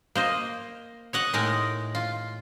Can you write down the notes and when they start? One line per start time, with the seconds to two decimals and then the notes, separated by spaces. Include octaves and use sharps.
0.15 A#3 C5 D#5
1.13 C#5 D#5 F#5
1.33 A2 G#3 D#4 A#4
1.95 F4